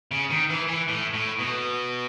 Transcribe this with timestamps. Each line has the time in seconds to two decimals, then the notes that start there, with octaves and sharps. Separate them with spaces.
0.11 C#3
0.30 D#3
0.50 E3
0.68 E3
0.88 A2
1.14 A2
1.39 B2